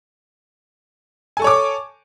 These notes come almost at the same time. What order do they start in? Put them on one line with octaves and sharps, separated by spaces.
G#5 A4 C#6 C#5 D6